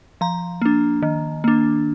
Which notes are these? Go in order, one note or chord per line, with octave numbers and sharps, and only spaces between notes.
F3 A#5
A#3 D4
D#3
A#3 D4